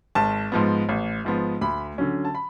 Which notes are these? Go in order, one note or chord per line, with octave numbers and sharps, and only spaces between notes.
G#1 A5
G#2 F3 B3
A1
G#2 F3 B3
D2 B5
D3 F#3 C#4
A5
B5